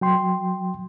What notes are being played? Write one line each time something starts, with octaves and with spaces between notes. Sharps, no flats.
F#3 G5 C6